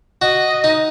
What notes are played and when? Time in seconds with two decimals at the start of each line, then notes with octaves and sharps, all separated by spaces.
0.22 F#4 D#5
0.64 D#4